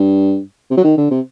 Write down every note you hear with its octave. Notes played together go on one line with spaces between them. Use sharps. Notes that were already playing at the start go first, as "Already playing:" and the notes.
Already playing: G2
C3
F#3
D#3
D3
C3